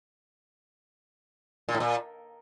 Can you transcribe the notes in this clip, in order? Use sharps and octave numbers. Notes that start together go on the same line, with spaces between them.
A#2
A2
A#2